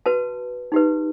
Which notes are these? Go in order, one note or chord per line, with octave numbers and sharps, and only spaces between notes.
F#4 B4 A5
D#4 G4 B4